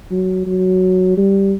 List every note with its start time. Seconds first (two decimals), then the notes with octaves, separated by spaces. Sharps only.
0.11 F#3
0.46 F#3
1.17 G3